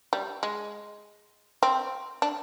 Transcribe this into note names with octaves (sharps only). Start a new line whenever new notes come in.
G3
G#3
C4
D4